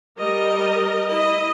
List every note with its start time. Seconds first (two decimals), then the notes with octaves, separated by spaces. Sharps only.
0.18 G3 A#4 D#5
1.08 E4 D#5